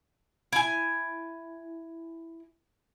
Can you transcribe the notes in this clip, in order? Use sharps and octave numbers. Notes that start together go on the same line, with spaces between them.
E4 G#5